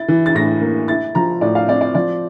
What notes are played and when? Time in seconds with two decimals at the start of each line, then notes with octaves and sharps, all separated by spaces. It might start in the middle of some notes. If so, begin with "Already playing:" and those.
Already playing: E4 A6
0.08 E3
0.26 A6
0.35 A2 A#6
0.62 A#3
0.88 E4 A6
1.15 F3 A#5
1.41 A2 D5
1.55 F5
1.68 C4 D5
1.81 D5
1.95 F3 D5